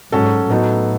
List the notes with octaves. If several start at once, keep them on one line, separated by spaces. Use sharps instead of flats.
G#2 F#3 C#4 F#4 A4
A2 F#3 B3 D#4 A4